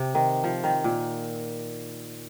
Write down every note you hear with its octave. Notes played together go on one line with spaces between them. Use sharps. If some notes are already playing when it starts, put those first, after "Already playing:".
Already playing: C3
D#3
F3
D#3
A#2